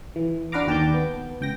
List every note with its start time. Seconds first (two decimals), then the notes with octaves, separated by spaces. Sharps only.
0.16 E3
0.52 D4 F#4 B4 F5 A#5 D6
0.67 D#2 G4 A5 D6 G6
0.94 B3
1.41 C#2 G5 A#6